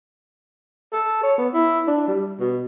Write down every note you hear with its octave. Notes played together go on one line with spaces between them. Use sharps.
A4
C#5
B3
E4
D4
G3
B2